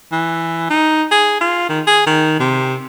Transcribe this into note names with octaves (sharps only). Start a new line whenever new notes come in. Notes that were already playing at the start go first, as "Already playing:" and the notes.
E3
D#4
G#4
F4
D#3
G#4
D#3
C3